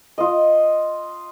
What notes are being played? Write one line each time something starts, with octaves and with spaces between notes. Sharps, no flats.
F4 D#5